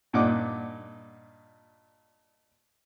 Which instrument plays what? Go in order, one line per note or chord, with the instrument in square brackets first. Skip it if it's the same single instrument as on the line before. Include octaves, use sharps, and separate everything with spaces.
[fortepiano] G2 A#2 D#4 F#5 D6